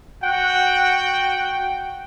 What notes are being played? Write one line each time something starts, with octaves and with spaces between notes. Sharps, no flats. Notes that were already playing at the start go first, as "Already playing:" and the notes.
F#4 F#5 G5